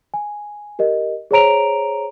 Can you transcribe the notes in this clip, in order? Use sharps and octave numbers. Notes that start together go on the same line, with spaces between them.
G#5
G4 A#4 D#5
G#4 C5 C#5 A#5 D7 F7